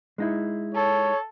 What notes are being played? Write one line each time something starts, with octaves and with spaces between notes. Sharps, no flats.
G#3 D#4 E4
A4 C#5